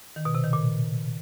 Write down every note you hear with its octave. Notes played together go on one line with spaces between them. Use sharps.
D#3
B2
C3
D#3
A#2